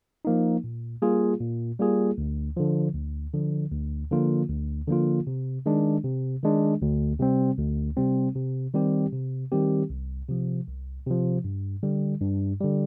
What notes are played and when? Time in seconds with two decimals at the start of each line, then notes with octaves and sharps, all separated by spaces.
0.25 F3 A#3 D#4
0.64 A#2
1.02 G3 A#3 F4 G#4
1.40 A#2
1.79 G3 A#3 F4 G#4
2.18 D2
2.57 D3 F3
2.95 D2
3.34 D3 F3
3.72 D2
4.11 D3 F3 A#3 F4
4.49 D2
4.88 D3 F3 A#3 F4
5.27 C3
5.66 D#3 G#3 D4
6.04 C3
6.43 D#3 G#3 D4
6.81 D2
7.19 C3 G3 C4
7.58 D2
7.97 C3 G3 C4
8.35 C3
8.74 D#3 G3 C4 G4
9.13 C3
9.52 D#3 G3 C4 G4
9.90 C2
10.29 C3 F3
10.67 C2
11.06 C3 F3
11.44 G2
11.83 D3 G3
12.21 G2
12.60 D3 G3